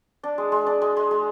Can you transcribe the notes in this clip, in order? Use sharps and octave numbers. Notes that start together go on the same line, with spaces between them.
D4
G#3
G#3
D4
G#3
G#3
G#3